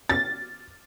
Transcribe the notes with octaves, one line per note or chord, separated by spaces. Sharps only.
A6